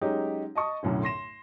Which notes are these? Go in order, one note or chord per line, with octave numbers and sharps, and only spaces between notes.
F#3 G#3 C#4 D#4 G4
D#5 A5 C#6 D#6
B1 F#2 A2 D3
C6 A#6 E7